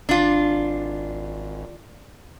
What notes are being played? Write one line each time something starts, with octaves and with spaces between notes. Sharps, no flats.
G#1 D4 F4